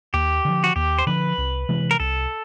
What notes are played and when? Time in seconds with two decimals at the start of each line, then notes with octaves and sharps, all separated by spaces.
0.14 D#2 G4
0.45 D3 F3
0.64 F#4
0.76 D#2 G4
0.99 C5
1.07 D3 F3 B4
1.38 C2
1.69 C3 E3 G#3
1.91 A#4
2.00 C2 A4